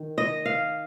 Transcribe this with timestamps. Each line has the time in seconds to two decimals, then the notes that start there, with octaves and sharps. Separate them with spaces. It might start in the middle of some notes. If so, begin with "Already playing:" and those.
Already playing: D#3
0.18 D#5
0.46 F5